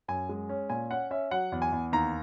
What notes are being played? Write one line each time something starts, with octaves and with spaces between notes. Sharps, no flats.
F#2 G#5
G#3
C#4
A#2 G#5
C#4 F#5
C#4 E5
F#3 F#5
E2
G#5
E2
D#2 A#5